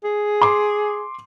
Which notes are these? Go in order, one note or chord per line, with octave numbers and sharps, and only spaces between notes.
G#4
C6 D6